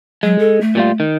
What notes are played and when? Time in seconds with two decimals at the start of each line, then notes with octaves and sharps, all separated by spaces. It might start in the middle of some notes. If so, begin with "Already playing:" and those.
0.23 F#3 G#3
0.38 A4
0.61 A3
0.75 A#2 G3 F4
1.00 D#3